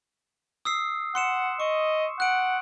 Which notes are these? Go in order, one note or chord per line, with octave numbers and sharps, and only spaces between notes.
D#6 E6 C7
F#5 C6 C#7 E7
D#5 C#6
F#5 F#6 D7